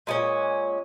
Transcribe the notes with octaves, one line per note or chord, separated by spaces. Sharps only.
A#2 G#3 C#4